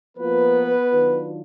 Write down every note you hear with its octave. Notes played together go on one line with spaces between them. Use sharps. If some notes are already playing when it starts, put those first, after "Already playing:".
F3 A#3 B3 F4 B4
D#3 F#3 D4 F4